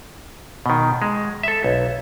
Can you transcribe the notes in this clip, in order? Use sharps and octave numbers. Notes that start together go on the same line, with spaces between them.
B2 D#3
G#3
A4 E5
B1